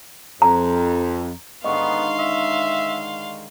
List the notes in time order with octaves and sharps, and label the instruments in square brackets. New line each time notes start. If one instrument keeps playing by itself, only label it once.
[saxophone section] F2 [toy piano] A#5
[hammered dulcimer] G#2 D3 D#3 [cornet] B3 [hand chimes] D#5 C#6 [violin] F5 C6
[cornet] E5